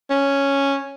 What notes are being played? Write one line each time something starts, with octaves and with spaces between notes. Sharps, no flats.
C#4